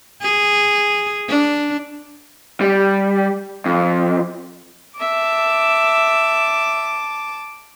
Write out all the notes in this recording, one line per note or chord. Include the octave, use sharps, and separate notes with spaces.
G#4
D4
G3
F2
E5 A5 D6